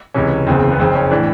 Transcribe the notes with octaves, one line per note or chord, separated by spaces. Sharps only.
C#2 C3 E3 C#4
F#1 E2 C#3 C4
B3
F#1 F2 C#3 C4
C#4
A2 E3 D4